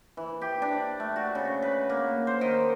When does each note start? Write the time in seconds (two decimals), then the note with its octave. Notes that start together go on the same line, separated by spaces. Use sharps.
0.17 E3
0.41 G4
0.62 D4
1.00 A3
1.16 F#4
1.35 C#3
1.62 B4
1.90 A#3
2.27 C5
2.41 D#3